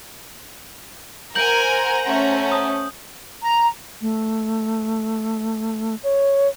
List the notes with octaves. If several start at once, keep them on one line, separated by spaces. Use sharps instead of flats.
A#4 C5 F#5 G#5 A#5 G6 F#7
A3 C#4
D#6
A#5
A3
C#5